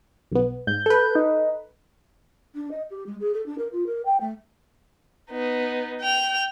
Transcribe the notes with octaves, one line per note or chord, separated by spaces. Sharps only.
B1 B3
G#2 G6
A4 B4
D#4
D4
D#5
G4
G#3
G#4
A4
D4
A#4
F4
A#4
G5
A3
B3 D#4
G5 F7